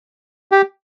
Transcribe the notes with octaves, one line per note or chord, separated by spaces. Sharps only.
G4